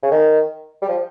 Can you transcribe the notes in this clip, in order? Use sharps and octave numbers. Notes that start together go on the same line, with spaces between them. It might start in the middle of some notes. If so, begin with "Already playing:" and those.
C#3
D#3
G3
F3